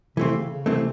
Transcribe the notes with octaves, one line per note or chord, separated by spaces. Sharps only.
C3 E3 A3 C4
C#3
C#3
C3 E3 A3 C4